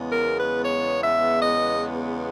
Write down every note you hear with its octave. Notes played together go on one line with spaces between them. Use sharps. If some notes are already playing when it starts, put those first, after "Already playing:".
Already playing: E2 C#3 G#3 B3
A#4
B4
C#5
E5
D#5